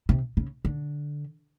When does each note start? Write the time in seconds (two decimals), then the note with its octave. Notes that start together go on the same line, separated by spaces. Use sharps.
0.09 C3
0.37 C#3
0.65 D3